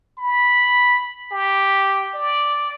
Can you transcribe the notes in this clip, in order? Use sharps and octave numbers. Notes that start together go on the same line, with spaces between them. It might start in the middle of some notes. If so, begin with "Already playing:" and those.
B5
G4
D5